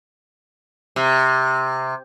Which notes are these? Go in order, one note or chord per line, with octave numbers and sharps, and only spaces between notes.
C3